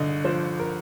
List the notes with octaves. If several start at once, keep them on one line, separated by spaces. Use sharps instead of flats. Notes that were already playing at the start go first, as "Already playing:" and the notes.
Already playing: G1 D3 D#5
F3 C5
A#4